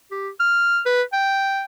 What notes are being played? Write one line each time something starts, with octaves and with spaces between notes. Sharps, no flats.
G4
F6
B4
G5